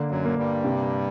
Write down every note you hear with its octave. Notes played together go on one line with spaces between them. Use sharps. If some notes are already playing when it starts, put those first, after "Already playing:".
Already playing: D3 A#3
F#2 F#3
A#3
G2 G3
C3